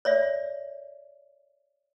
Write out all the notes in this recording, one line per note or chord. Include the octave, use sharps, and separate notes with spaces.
C#5 D5 E5